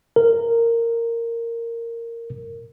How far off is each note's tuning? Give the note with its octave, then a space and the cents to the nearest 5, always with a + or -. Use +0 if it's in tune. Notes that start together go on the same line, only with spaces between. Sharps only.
A#4 -10